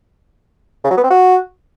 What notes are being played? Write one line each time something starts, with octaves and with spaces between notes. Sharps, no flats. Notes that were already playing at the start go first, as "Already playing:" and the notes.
C#3
F#3
B3
C4
F#4